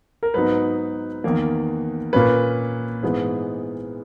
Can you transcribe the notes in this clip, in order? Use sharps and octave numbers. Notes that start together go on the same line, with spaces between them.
A#4
G#2 F#3 B3 D#4 B4
E2 D#3 A#3
A#2 A#3 C#4 B4
G#2 E3 G#3 B3